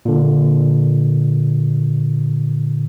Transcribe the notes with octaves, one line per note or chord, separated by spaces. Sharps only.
A#2 D3